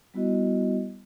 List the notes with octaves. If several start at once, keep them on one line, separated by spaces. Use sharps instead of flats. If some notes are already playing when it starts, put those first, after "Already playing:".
G3 B3 E4 F#4 D#5